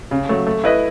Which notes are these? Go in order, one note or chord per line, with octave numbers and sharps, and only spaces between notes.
C#3
F#3 A3
A3
E4 B4 D#5